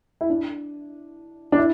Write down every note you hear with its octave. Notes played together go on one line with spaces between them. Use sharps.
E4
D4
D4
E4